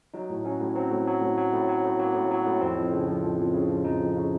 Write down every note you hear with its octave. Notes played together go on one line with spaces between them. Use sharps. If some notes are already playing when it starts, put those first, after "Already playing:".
F#3 D#4
A2
F#3 C#4
A2
F#3 C4
A2
F#3
A2
F#3
A2
F#3
A2
F#3 A#3
A2
F#3
A2
F2 C4
F2
C#3
F3
F2
F2
C#3
F3
F2 D#4
F2
C#3